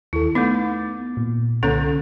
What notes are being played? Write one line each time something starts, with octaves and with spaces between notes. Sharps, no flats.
D#2 E4 A4
A3 B3 D#4 D6 A6
A#2
C2 D3 A#3 C#4 A4 A#5